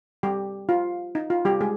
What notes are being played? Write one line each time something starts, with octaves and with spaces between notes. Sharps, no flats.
G3 G4
F4
D#4
F4
G3 G4
G#3 G#4